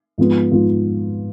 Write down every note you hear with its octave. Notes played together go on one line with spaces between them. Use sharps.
G#2 F3 B3 F4
G#2 F3 B3 F4